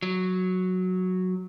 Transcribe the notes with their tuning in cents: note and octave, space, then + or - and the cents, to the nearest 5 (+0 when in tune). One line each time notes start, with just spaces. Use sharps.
F#3 -5